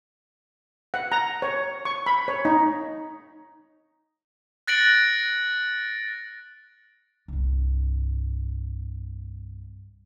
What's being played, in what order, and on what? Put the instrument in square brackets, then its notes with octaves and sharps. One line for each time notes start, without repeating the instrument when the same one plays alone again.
[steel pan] F#5
A#5
C#5
C#6
B5
C#5
D#4
[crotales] F#6 A6 A#6 C#7 D7 F#7
[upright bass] C2 G2